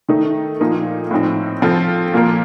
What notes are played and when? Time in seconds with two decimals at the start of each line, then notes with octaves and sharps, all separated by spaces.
0.09 D#3 A3 D#4
0.60 A#2 F3 A3 D#4 A#4
1.11 A2 F3 C4 D#4
1.62 F3 C4 F4 A4
2.13 A#2 F3 A#3 F4 A#4